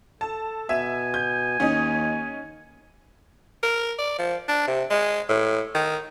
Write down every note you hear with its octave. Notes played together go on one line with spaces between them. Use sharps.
A4 A5
B2 E5 G#5 E7
G6
D#2 C#4 D#4
A#4
D5
F3
D4
C3
G#3
A2
D#3